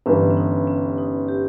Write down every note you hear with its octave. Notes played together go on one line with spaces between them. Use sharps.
G1 G2 E3 C#4
C#4
D#4
C#4
D#4
G4